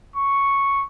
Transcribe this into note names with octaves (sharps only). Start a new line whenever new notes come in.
C#6